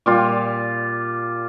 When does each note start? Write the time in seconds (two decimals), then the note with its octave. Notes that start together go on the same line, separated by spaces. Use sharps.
0.06 A#2 G3 F4